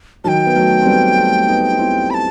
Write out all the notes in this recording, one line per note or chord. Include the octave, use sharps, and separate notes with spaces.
D#3 F#3 G5 A5
B3
F#3 A3
C4
G3 B3
A3 C4
B3 D#4
D#4
C4 E4
B5
A5